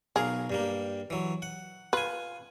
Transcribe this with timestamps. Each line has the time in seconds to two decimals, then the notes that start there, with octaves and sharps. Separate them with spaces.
0.16 B1 G#4 A#4 F5
0.50 G2 G3 A#3
1.10 E3 F#3
1.42 F#5
1.93 F4 B4 G#5